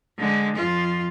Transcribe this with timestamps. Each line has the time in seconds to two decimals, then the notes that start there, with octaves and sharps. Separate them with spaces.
0.19 D3 G#3
0.55 F2 F4